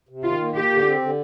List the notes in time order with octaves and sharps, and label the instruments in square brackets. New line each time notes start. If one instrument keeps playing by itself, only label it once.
[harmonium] C3
[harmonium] D#3 [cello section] F4
[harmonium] A#3
[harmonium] A#3 [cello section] G4
[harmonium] D3
C4
D3